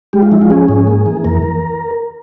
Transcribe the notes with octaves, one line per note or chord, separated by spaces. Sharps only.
G#3 G4
F4
F3 E4
F4
C#4 G#4
G#2
A#3
E3
F2 A#4